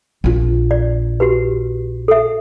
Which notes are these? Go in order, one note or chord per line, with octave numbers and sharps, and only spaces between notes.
A#1 F4
D5
F#4 G4 B4
A4 E5